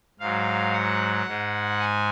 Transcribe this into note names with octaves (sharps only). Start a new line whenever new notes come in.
G#2 F#3 F5
F#5
G#2 G#3
G#5